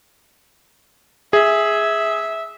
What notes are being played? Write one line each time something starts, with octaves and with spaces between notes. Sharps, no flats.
G#4 E5